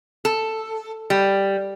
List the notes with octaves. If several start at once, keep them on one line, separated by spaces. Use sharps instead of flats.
A4
G3